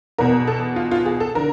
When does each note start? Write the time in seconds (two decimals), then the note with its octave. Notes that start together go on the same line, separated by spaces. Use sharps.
0.18 E2 B2 A#4
0.47 A4
0.76 F4
0.91 F4
1.06 G#4
1.20 A4
1.35 D3 A#4